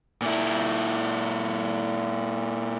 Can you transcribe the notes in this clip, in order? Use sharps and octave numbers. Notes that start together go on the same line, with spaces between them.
A#2 E4